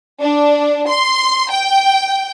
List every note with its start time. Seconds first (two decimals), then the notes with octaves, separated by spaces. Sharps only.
0.21 D4
0.88 C6
1.50 G5